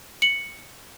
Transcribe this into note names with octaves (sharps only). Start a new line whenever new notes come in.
C#7 F#7